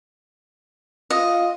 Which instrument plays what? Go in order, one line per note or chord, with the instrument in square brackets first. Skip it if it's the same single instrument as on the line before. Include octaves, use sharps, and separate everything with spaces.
[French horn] F4 [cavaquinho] D#5